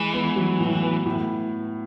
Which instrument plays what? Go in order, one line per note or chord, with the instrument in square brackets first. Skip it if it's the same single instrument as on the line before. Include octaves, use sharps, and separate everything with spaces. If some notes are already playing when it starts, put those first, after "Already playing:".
Already playing: [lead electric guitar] E3 [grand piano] G#3
[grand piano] B3
F#3
A2
B3
A2